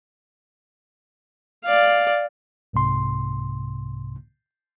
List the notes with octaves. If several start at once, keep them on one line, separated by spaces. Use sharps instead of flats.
D5 F5
C2 G#2 C3 C6